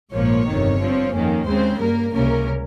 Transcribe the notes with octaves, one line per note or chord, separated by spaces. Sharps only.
A#1 G#2 F3 A#3 C#5
G1 F2 C3 D#3
G2 F3 C4
F2 D#3 A#3 C#4
D#2 C#3 G#3 C4 C5
G2 G3 A#3 A#4
C#2 C3 G3 A#3 C#4 A#4